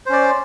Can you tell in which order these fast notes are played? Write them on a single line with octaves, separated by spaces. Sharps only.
C5 C#4 D5